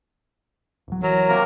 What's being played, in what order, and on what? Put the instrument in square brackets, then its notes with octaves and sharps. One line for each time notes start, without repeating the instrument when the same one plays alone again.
[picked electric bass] D1 F#3
[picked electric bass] E3 [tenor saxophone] F#3 [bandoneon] A#4
[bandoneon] C3 A#3 A#4